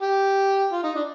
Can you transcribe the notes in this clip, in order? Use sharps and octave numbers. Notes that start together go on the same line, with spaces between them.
G4
F4
D#4
D4